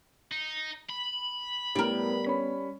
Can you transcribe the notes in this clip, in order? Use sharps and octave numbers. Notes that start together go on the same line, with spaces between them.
D#4
B5
A2 G3 B3 A#4
C#4 B5